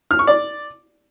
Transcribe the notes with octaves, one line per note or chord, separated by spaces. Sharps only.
F6
C#6
D5